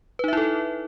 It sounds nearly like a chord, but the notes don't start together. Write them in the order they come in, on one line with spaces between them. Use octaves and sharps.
B4 D#4 E5 E4 A4